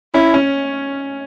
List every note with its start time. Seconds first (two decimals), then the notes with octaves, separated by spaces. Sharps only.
0.14 C#4 E4
0.34 C#4